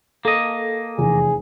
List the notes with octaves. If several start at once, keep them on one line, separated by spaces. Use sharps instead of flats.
A#3 A4 D#5
F1 E2 G#4